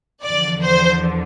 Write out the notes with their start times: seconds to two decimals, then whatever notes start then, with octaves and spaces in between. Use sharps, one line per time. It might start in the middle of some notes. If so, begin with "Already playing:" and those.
0.23 E2 D3 F3 D5
0.61 C5